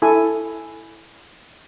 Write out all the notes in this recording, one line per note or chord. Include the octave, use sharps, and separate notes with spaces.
E4 A4 G#5